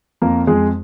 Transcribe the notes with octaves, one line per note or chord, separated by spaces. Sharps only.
F2 A#3 A#4
F2 G#3 G#4